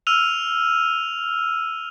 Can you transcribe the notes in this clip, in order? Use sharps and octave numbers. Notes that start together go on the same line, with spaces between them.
E6 F6 D#7 F7